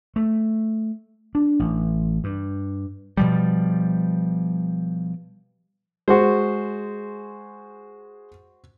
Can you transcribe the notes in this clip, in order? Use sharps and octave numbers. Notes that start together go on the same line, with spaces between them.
A3
D4
A1
G2
B2 F3 G3
G#3 F#4 G#4 C5